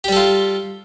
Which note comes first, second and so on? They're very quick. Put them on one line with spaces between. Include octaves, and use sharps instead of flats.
G4 G3 A4 F4